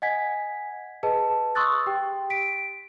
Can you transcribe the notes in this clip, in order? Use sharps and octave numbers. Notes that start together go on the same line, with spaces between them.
D#5 F#5 G#5 G#6 B6
G#4 B4 D#5 A5
C6 C#6 D#6 E6 F#6 A6
G4 G5
B6 D7